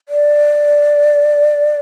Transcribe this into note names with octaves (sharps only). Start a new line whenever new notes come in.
D5